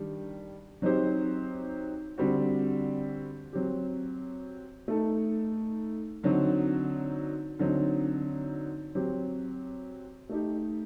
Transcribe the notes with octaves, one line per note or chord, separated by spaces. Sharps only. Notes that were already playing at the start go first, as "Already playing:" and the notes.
Already playing: D#3 G3 D4
F#3 C4 D#4 G4 C5
D3 G3 C4 F#4
F#3 C4 G4
A3 D#4 A4
D3 F#3 C4 D#4 F#4
D3 F#3 C4 D#4
F#3 C4 G4
A3 D#4 G4